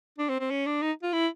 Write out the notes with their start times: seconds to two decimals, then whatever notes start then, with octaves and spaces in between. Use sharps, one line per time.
0.19 D4
0.29 C4
0.40 C4
0.50 C#4
0.66 D4
0.82 D#4
1.03 F4
1.13 E4